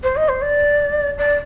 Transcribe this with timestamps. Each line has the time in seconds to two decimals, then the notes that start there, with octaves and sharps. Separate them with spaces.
0.04 C5
0.16 D#5
0.29 C5
0.42 D5
1.18 D5